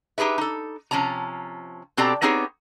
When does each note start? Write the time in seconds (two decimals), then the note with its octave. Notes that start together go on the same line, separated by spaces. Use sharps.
0.18 D#4 G4 G#4 B4 E5
0.38 D#4 A4
0.91 C3 F3 C#4 A5 A#5
1.97 B2 C4 G4 A4 D5 A#5
2.22 B3 C4 D#4 G4 G#4 C#5